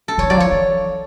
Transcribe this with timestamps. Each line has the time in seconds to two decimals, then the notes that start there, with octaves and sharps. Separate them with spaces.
0.08 A4
0.18 D#3 E3 C#5
0.30 F#3 D5
0.37 F3 C#5
0.52 E3